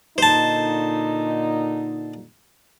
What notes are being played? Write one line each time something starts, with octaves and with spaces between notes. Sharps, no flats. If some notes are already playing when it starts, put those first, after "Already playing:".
A#2 D3 D#4 C5 A5